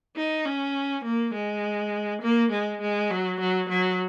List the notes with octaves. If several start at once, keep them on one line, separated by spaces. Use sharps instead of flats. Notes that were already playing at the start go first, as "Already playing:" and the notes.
D#4
C#4
A#3
G#3
A#3
G#3
G#3
F#3
F#3
F#3